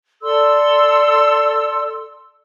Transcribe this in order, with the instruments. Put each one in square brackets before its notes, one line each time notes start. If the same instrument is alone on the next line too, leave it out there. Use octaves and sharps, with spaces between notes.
[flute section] A4 D5 C6 E6